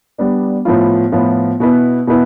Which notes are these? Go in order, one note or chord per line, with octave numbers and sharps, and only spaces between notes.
G3 B3 D4
A2 F3 B3 F4
A2 F3 B3 F4
B2 B3 E4 B4
B2 B3 E4 B4